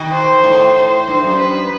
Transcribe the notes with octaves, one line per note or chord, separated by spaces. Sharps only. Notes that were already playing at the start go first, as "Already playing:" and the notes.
Already playing: B2 D#3
C5
A2
C5
G2
F#2
B4